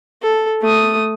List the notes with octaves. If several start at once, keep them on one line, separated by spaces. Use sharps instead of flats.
A4
A3 D#6